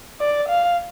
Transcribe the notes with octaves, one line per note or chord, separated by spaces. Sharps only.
D5
F5